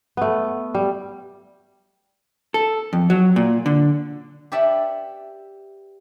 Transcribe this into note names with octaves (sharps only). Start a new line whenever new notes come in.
A3 B3
G3
A4
F2
F#3
A#2
D3
G4 B4 D5 E5 F#5 A5